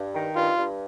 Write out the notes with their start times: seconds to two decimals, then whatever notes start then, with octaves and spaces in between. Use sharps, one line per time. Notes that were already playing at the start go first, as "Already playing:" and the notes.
Already playing: G2
0.15 D#3
0.36 G2 F4
0.57 G2